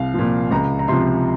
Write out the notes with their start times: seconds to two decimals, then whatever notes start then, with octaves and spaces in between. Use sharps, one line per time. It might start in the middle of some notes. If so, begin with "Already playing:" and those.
Already playing: C2 F5
0.14 A#2 F3
0.51 C#2 A#5
0.79 A#5
0.88 C3 F3 C6